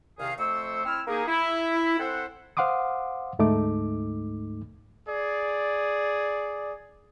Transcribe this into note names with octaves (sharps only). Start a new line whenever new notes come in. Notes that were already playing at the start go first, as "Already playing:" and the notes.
C2 C3 D#3 D#4 G#4 F5
F2 A3 C5 C#6 E6
C4 E4 E6 F6
A#3 D#4 G#4
E4
C4 A4 C5 E5 F#5
C5 F5 F#5 C6 D6 D#6
D2 G#2 A3 D#4 D6
G#4 D5